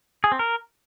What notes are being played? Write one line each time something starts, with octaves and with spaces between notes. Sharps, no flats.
G#4
C4
A#4